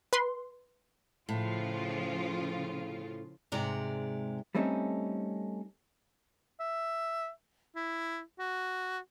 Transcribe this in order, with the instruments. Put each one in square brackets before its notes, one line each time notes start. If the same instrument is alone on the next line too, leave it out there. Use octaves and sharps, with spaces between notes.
[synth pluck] B4 C6
[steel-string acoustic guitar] A2 [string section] C#3 F3 F4
[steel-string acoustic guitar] G#2 C3 G#3 D5 A#5
[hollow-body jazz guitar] G3 A3 C4 C#4 D#4 A4
[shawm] E5
E4
F#4